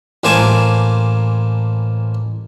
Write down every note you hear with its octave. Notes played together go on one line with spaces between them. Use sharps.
A1 A#3 C5 G#5 A5 D6